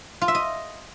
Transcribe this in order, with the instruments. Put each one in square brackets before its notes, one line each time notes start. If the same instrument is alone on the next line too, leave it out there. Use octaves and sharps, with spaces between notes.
[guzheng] F4
E5
D#5